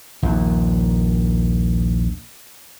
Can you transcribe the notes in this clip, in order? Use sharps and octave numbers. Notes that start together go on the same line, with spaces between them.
A#1 D#2